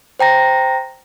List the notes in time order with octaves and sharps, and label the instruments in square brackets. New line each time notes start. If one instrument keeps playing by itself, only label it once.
[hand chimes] C5 G5 A#5 A#6